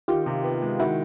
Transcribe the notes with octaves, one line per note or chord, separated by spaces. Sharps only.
D#3 F4 G4
C3
B3
G#3
D#3 E4 F#4